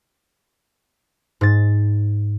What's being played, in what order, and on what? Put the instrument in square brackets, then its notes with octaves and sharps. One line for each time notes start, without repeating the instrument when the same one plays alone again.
[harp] G#2 A6